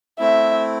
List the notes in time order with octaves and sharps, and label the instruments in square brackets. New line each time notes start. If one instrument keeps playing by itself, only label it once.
[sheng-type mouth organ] A3 C4 E4 [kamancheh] E5